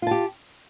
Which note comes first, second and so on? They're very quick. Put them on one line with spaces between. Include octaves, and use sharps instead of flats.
F4 A5 G4